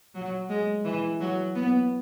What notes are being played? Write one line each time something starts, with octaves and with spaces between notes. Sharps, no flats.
F#3
G#3
E3
F#3
B3